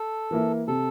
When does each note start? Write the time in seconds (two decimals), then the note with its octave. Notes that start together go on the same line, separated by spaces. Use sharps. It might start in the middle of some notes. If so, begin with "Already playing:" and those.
Already playing: A4
0.31 E3 A#3 E4
0.68 C3 A4